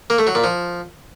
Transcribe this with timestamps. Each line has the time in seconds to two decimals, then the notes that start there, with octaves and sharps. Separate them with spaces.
0.10 A#3
0.18 A3
0.27 F#3
0.35 A#2
0.44 F3